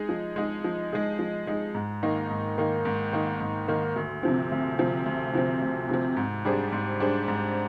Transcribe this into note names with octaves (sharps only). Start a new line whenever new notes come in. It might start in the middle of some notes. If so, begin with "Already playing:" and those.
Already playing: G#3 D#4 G#4
F3
G#3 D#4 G#4
F3
G#3 D#4 G#4
F3
G#3 D#4 G#4
G#2
D#3 A#3 D#4
G#2
D#3 A#3 D#4
G#2
D#3 A#3 D#4
G#2
D#3 A#3 D#4
D2
C3 F3 C4
D2
C3 F3 C4
D2
C3 F3 C4
D2
C3 F3 C4
G#2
G3 D4 G#4 C5
G#2
G3 D4 G#4 C5
G#2